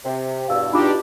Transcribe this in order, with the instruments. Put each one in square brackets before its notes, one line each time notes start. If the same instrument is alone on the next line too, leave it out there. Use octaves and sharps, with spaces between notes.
[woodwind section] C3
[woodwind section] E2 G2 B2 [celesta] F5 E6
[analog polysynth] D4 D#4 G4 [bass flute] F4 [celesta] B5 D6